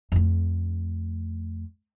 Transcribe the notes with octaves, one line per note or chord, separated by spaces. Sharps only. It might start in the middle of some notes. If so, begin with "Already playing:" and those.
F2 A3